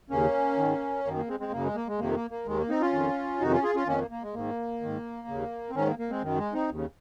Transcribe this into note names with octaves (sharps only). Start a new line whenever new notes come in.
D#2 C#3 A#3 C#4
G#2 D#3
F#2 D#3 A#3
A#3
G#3 C4
G#3 C4
F#2 C#3 A#3
G#3
A#3
G#3
F2 C3 D#3 A#3
A#3
A#3
D#2 D#3 G#3
A#3
C4 D#4
C#4 F4
F2 D#3
F2 C3 D#3 D#4 F#4
C#4 F4
F4 G#4
C#4 F4
F2 D#3 A#3 C#4
A#3
A#3
G#3
G#2 D#3 A#3
G#2 D#3
D#2 C#3
C4
G#2 D#3 A#3 C#4
A#3
A#3
G#3 C4
F#2 D#3
G#3
C4 D#4
D#2 C#3